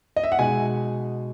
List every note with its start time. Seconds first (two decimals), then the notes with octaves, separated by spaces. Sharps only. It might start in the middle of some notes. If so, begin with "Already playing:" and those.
0.16 D#5
0.24 E5
0.32 F#5
0.39 B2 G#3 D#4 G#5